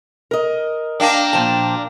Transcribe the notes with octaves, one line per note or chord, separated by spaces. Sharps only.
A#4 D#5
A#3 D4 G5
A#2 F3 A5